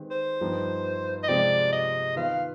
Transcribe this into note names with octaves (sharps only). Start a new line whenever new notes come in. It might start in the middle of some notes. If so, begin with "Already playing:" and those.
Already playing: D#3 G#3 C4 G4 B4
C5
G2 F3 B3 D#4 G4
D#5
C3 F3 G#3 C4 G4 D5
D#5
D#3 B3 F4 B4 F5